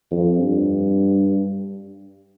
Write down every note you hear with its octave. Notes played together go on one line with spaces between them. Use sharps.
F2
G2